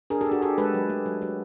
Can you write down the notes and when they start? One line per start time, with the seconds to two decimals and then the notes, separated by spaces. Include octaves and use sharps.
0.10 D4 G#4 A#4
0.21 G4 A4
0.26 D4
0.32 F#4 G#4
0.42 D4 G4 A4
0.58 G#3 A4 B4
0.74 F#3
0.90 A3
1.06 F#3
1.22 F#3